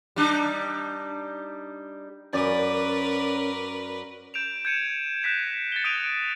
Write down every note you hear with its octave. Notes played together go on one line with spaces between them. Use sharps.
G3 D4 D#4
F#2 C#4 A#4 B4 D5
G6 D7 E7 F7
G6 G#6 C#7 D#7 E7
F#6 G6 A#6 B6 E7
A6 C#7 G7
D#6 F#6 D7 D#7 F7